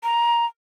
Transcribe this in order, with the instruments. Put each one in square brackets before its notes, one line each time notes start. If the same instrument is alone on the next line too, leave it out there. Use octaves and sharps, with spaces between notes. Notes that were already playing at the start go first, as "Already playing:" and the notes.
[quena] A#5